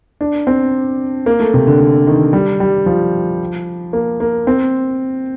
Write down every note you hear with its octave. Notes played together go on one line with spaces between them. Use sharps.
D4
C4
A#3
A3
C3
D3
D3
D#3
G3
G3
F3
A#3
A#3
C4